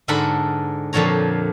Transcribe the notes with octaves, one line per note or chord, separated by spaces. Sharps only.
G#2 D3 A4 A#4 F#5 B5
F2 A#2 D3 F3 C#5 A#5